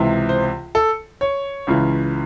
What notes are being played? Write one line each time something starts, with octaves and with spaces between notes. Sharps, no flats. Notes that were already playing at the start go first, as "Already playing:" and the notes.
Already playing: C#2 C3 E3
C5
A4
C#5
C#2 C#3 E3